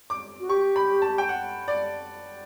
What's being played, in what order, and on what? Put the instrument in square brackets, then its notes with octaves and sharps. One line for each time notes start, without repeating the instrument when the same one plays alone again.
[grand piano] D6
[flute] F#4
[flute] G4 [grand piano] C#6
[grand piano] B5
A5
G5
F#5
D5